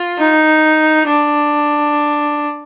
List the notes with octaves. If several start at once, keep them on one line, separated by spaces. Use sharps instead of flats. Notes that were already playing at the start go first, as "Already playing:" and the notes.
Already playing: F4
D#4
D4